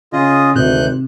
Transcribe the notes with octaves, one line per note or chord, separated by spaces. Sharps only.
C#3 F4 G#4 D#5
G#1 D2 C3 F#6 G6